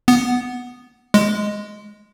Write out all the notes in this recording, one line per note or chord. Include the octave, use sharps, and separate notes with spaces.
B3
G#3